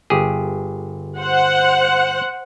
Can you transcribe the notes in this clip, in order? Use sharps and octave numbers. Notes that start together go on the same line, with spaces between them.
G1 G4 G#4
C5 F#5